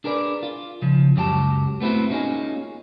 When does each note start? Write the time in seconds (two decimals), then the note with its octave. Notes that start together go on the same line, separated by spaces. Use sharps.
0.04 D4 G#4 A#4 B4 D5
0.43 F4
0.82 C#3 F3
1.16 C#2 F#2 F#3 G4 G5 A5
1.80 A3 B3 C4 E4 F#4
2.10 A#3 C#4 D#4 F4 G#4